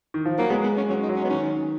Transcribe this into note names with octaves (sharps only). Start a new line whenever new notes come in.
D#3
F3
F#3 A#3
G#3 B3
B3
C#4
F#3 C#4
D#4
F#3
C#4
B3
D#3 C#4